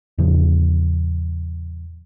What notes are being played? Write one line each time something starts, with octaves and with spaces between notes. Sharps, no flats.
E2 A2 C#3 F3